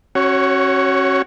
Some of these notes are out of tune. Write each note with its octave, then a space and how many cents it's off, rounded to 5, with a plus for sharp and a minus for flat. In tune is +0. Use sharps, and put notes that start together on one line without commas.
C#4 -25 F#4 +15 C#5 +10